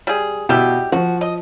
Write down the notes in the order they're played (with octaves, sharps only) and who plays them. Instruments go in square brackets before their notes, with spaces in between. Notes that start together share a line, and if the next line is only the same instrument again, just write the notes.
[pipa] G3 G#4
[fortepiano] B2 [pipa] G3 E4 G4
[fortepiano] F3 [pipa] F#4
[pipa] D#5